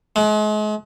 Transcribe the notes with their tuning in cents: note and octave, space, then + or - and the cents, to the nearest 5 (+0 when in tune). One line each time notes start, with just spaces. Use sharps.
G#3 +40